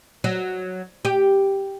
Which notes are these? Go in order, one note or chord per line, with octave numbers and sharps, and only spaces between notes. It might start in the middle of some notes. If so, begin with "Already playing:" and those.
F#3
G4